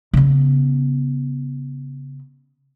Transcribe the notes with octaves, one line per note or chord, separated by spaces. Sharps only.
C#3 B3